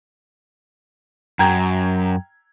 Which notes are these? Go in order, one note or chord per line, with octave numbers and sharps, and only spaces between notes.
F#2 G5 A#5 G#6